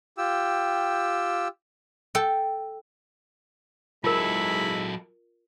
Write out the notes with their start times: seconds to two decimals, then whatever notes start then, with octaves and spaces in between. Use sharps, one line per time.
0.18 F4 G4 G5 E6
2.15 A4 G5
4.04 G#2 F#3 G#3 E4 F4 A4 A#4 B5